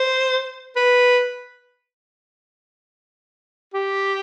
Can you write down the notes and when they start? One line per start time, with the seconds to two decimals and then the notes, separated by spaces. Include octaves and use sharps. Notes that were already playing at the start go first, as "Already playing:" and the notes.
Already playing: C5
0.76 B4
3.74 G4